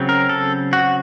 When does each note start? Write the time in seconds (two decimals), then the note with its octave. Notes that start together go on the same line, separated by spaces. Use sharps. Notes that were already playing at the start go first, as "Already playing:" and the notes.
Already playing: C#3 F#3 C4
0.09 A#4
0.29 A4
0.73 F#4